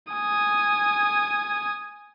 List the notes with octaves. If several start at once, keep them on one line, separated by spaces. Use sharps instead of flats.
G#5 D#6